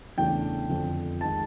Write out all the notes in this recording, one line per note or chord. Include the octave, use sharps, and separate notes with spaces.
E2 C#3 E3 A3 D4 G5
F2 D3 F3
D#3 G#3 A5